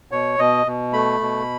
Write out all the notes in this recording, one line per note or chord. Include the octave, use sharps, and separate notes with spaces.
B2 C#5
B2 D#5
B2
A3 B5
B2